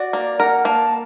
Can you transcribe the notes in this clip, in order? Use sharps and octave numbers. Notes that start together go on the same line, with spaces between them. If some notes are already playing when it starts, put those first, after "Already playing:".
Already playing: F#4 D5
A#3
A#4 F#5
A#3 A5